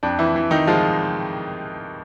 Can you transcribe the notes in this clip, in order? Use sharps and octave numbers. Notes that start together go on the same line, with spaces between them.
F2 D4
E3 E4
E3
D#3 D#4
F3 G#3 F4